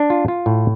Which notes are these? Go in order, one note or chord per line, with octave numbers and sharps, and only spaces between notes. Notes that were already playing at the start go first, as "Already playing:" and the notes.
Already playing: D4
F4
F4
A2